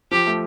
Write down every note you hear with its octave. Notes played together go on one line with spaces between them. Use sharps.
F3 G4
A3